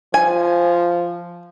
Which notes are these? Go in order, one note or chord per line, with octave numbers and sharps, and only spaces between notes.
F3 G#5